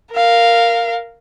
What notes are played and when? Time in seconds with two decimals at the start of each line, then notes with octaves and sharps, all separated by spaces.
0.13 A#4 F5